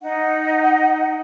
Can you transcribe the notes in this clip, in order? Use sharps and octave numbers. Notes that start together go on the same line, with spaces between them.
D#4 F#5